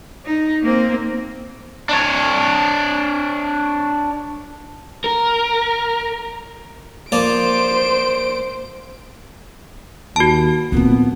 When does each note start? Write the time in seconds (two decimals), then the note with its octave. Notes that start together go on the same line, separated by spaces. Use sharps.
0.25 D#4
0.62 A#3 C4
1.89 D4 C#5
5.04 A#4
7.12 F3 A#3 C5 D5 D7
10.16 D#2 F#4 A5
10.72 D2 A#2 B3 C4